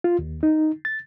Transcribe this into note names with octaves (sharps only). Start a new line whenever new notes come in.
F4
D#2
D#4
A6